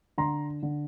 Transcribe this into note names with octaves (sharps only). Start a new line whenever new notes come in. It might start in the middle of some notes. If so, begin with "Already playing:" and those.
D3 A#5 C6
D3